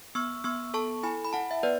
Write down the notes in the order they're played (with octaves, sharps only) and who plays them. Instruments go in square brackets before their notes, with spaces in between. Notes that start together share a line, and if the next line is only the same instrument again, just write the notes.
[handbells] B3 C#6 E6
B3 C#6 E6
A4 A5 C#6
E4 G#5 B5
B5
E4 F#5 A5
E5
B3 B4 D5